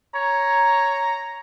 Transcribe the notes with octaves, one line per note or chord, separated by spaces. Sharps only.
C#5 A#5